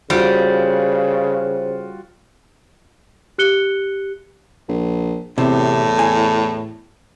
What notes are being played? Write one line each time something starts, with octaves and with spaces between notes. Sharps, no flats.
C#3 G3 F4 F#4 C5
G4 F#6 C#7 G7
A#1
E2 A2 C3
G#5